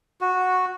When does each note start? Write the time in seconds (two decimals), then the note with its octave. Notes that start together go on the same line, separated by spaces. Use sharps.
0.21 F#4